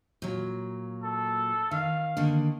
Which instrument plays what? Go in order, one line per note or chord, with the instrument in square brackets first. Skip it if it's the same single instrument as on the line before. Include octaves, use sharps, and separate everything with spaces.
[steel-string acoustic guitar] A#2 F#3
[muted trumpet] A4
[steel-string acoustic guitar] D#3 [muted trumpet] F5
[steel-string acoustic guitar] D3 D#3 A#3